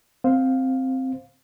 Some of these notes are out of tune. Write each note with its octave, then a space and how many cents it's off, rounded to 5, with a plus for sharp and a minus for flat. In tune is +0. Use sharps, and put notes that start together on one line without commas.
C4 +0 C5 +0 F5 +15